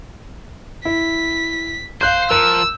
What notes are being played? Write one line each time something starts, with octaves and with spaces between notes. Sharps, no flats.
E4 B6
C5 F5 F#6 G6 C7
F3 A#4 E6 F#6